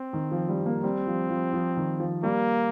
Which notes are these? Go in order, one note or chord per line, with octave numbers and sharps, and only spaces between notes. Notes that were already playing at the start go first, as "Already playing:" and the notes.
Already playing: C4
D#3
F3
G3
A#3
G3 C4
F3
F3
F3
D#3
F3
G3 A#3